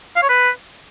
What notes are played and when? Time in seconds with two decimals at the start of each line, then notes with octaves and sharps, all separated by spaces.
0.16 F5
0.23 C#5
0.29 B4